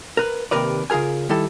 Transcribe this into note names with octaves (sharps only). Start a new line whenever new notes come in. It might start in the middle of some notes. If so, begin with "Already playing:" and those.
A#4 B4
D#2 C3 A#4 B4 D5
C#3 F4 G#4 A#4 G#5
D#3 G3 E4 A4